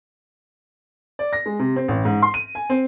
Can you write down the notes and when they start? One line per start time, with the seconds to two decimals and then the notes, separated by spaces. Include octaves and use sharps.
1.19 D5
1.33 A#6
1.46 G#3
1.59 C3
1.76 C4
1.88 A1
2.05 G#2
2.22 C6
2.34 D#7
2.55 G#5
2.70 C4